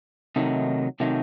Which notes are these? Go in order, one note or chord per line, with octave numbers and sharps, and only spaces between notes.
C3 D#3 F#3 A3 D#4
C3 D#3 F#3 A3 D#4